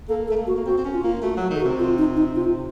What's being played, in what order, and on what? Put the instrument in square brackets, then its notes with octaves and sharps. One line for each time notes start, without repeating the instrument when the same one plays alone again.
[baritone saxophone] A#3 [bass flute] A4
[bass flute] A4
[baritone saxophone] A3
A#3
[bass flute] F#4
[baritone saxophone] A#3
[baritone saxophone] C4 [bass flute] F#4
[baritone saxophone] C4
C#4
[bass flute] F4
[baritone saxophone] A#3
[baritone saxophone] A3 [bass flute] F#4
[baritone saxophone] F#3 [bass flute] F#4
[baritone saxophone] D#3
[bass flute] A4
F#4
[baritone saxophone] C3
[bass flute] F4
D#4
D#4
F4